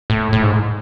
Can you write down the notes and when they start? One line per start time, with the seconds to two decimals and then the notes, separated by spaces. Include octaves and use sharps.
0.10 A2
0.33 A2
0.42 G#2